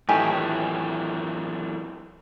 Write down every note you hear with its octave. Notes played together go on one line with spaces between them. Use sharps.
F#2 A2 D#3 E3 G4 G#5 A5